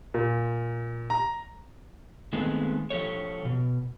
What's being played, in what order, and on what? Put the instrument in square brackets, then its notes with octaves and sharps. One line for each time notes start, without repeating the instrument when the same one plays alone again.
[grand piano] A#2
A#5
[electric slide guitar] D#3 G#3 A3 B3 C4
F3 G4 A4 C#5
B2